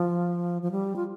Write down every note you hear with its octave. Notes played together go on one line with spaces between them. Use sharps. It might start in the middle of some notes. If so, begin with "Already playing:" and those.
Already playing: F3
F3
G3
F4